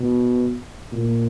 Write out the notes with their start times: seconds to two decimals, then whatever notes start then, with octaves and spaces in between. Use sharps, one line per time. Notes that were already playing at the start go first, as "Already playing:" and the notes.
Already playing: B2
0.92 A#2